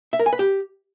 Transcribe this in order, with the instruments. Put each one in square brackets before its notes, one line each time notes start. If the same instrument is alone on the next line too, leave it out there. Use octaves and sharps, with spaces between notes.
[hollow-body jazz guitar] E5
A#4
G#5
B4
G4